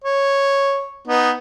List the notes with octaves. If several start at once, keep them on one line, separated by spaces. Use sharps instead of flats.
C#5
B3 D#4